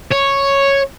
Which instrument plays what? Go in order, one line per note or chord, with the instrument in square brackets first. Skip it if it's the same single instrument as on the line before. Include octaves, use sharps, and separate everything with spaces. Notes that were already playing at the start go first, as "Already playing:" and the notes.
[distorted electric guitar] C#5